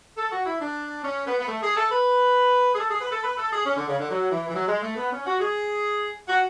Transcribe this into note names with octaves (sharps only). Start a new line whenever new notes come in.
A4
F#4
E4
D4
C#4
B3
B3
A3
G#4
A4
B4
G#4
A4
G#4
B4
A4
B4
A4
G#4
C#4
D3
C#3
D3
F#3
E3
E3
F#3
G#3
A3
B3
C#4
F#4
G#4
F#4